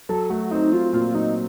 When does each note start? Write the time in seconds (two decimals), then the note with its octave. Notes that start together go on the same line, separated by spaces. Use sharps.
0.09 F#3 A4
0.30 A3 F#4
0.51 C4 D#4
0.72 F#3 F4
0.93 A#2 F4
1.14 F#3 D#4